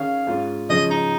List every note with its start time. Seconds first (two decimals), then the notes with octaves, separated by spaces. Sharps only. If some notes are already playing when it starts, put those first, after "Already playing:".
Already playing: D#3 C#4 G#4 F5
0.27 G#2 G#3 C#4 F4
0.70 C#3 F3 G#3 C#4 D#5
0.90 D#4